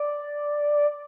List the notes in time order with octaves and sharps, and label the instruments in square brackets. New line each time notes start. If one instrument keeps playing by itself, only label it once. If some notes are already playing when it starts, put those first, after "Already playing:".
Already playing: [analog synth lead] D5